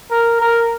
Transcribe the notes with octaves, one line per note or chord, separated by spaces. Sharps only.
A#4
A#4